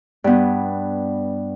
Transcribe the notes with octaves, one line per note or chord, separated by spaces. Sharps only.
G2 B3